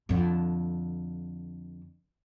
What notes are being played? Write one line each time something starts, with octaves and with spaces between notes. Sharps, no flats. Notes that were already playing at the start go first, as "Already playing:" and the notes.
F2 D3